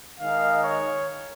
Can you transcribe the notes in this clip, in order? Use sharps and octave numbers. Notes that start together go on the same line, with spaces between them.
D#3 G#3 D#4 F5
C#5